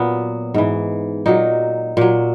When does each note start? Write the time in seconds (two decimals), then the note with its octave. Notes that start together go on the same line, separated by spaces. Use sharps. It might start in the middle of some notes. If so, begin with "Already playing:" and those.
Already playing: A#2 F#3 B3
0.54 G#2 E3
1.26 A#2 F#3 D#4
1.97 A#2 F#3